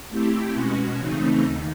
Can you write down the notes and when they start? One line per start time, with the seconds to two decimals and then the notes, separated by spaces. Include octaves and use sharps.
0.10 A3 C4 E4 G4
0.53 B2 G#3 C#4 F#4
0.97 C#3 E3 A3 C4 D#4
1.42 D#2 D#3